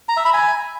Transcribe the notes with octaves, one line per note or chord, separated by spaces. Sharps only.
A#5
E5
B5
G#5